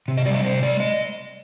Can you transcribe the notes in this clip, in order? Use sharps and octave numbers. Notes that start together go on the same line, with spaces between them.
C3
D#5
G3 D5
D#5
C3 C5
G#3 D5
D#5